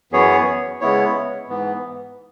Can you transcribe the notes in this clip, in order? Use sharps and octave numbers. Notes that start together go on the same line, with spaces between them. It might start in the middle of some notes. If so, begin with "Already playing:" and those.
F#2 E3 B3 G#4 C#5
C#3 G#3 B3 E4 C#5
G#2 E3 B3